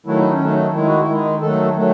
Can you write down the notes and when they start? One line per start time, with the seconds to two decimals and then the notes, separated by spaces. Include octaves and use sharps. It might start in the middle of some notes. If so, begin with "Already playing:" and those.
0.06 D#3 F#3 A3 E4
0.19 D#4
0.32 C#4
0.40 D#3 F#3 A3 D#4
0.73 D#3 G#3 E4
0.87 F#4
1.00 E4
1.08 D#3 G#3
1.41 D#3 F#3 A3 A4
1.76 D#3 F#3 A3